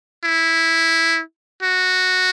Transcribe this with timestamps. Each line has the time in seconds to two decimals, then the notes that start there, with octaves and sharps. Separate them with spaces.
0.24 E4
1.63 F#4